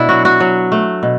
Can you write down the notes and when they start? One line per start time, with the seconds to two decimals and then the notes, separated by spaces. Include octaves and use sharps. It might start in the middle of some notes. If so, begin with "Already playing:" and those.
Already playing: B2 D4 E4
0.09 F#3 F#4
0.25 F#4
0.40 F#3
0.72 A3
1.03 B2